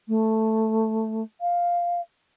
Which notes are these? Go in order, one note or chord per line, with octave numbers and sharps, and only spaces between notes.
A3
F5